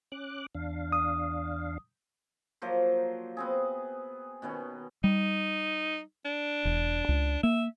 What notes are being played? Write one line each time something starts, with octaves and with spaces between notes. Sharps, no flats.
C#4 D6 F#6
E2 D4 F5
D#6
F3 F#3 A#3 C5
B3 C4 G#4
B2 D#3 B3 C#4
G3 D#4
D4
E1
C#2
A#3 E5